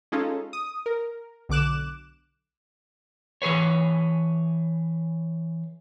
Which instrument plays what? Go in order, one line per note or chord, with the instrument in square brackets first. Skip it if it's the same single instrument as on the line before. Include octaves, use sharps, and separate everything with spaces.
[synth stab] G#3 C#4 D#4 F4 A4
D#6
A#4
B1 D3 D6 F#6 E7
[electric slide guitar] E3 G#4 B4 C#5